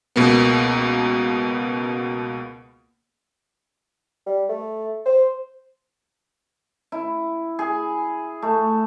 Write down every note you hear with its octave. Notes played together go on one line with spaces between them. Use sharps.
C#2 B2 A#3 B3
G3
A3
C5
E4
G#4
A3